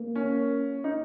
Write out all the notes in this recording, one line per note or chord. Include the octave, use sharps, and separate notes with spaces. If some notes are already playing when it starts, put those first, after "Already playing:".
Already playing: A#3
C#4
D#4